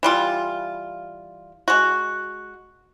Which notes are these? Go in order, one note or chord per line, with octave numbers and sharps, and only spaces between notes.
E3 G3 F4
G#3 F#4